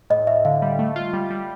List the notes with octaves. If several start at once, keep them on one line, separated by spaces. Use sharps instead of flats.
A2 D#5
A2 E5
D3 F5
G3
A3
F4
G3
G3